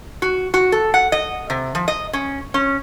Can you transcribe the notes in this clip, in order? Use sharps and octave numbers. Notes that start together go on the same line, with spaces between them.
F#4
F#4
A4
F#5
D#5
C3
F3
D#5
C#4
C#4